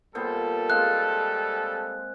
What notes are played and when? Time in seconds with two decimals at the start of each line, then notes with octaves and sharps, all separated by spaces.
0.15 A#2 G3 B3 A4 C5
0.70 G#3 C4 F5 F#6